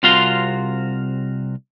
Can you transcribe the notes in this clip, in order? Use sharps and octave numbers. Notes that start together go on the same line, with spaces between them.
C2 C3 F4 F#4 F5 C6